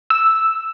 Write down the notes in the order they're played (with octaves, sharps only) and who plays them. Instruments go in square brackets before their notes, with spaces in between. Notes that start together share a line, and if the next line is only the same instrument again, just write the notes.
[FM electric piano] E6